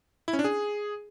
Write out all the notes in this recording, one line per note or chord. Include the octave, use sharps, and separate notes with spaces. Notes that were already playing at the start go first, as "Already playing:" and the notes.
E4
C#4
D4
G#4